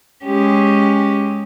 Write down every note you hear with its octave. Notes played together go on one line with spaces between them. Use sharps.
G#3 C#4 G4